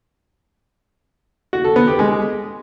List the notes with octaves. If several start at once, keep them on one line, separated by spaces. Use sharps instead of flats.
F#4
A4
B3
G4
G#3